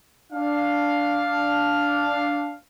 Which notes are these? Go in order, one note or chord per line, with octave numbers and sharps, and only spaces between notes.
D4 F5